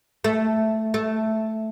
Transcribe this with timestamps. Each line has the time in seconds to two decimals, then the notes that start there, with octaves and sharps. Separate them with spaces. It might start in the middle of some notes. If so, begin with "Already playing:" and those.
0.24 A3
0.94 A3